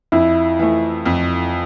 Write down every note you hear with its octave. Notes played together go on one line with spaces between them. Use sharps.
F2 E4
E3 A3
F2